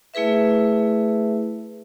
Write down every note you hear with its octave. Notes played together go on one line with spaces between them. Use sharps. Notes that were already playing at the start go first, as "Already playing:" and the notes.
A3 E4 G#4 B4 E5